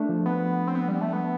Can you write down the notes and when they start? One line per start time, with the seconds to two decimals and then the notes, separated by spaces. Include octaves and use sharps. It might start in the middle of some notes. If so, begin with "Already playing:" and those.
Already playing: A3 D4
0.09 F3
0.26 B3
0.68 C4
0.75 B3
0.88 G3
1.01 A3
1.13 B3